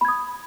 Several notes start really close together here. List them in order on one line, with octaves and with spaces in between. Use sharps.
B5 G#6 D#6